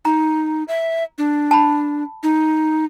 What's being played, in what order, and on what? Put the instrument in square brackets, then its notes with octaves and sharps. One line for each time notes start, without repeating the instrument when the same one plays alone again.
[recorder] D#4 [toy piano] A#5
[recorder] E5
D4
[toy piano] A5 B5
[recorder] D#4